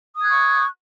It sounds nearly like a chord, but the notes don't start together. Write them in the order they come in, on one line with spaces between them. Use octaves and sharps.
D#6 G#6 F#6 C#6